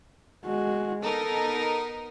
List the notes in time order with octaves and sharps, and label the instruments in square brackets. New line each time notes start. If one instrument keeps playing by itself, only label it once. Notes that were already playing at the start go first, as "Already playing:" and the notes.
[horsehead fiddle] G#3 F#4
[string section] B3 D#4 A#4 [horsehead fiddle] A4